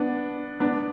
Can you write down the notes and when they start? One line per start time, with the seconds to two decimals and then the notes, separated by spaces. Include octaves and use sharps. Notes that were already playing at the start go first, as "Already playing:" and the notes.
Already playing: B3 D4
0.60 B3 D4